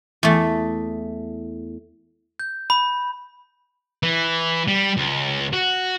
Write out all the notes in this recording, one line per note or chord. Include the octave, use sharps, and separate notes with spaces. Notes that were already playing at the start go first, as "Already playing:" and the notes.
E2 A3
G6
B5
E3
G3
C#2
F#4